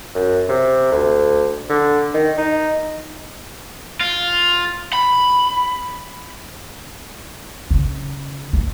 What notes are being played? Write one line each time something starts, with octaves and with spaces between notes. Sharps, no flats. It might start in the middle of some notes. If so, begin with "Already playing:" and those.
F#2
C3
D2
D3
D#3
D#4
F4
B5
C#3
G#3